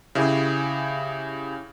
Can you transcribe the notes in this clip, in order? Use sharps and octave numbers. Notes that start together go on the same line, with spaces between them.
C#3 E4 G4 G#4